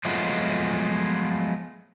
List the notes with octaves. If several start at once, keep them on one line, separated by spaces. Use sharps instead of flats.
F3 F#3 G#3 A3 B3 F4